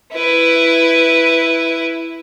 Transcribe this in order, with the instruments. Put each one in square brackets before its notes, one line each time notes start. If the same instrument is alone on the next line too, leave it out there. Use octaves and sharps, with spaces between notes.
[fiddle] E4 B4